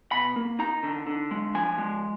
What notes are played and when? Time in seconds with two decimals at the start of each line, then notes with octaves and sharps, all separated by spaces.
0.12 B2 B5
0.36 A#3
0.59 D#4 A#5
0.83 D3
1.07 D3
1.31 G#3
1.54 F3 G#5
1.78 G#3